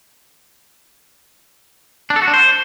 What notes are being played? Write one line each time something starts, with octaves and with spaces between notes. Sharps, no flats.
D4
A4
F#4
D4
C5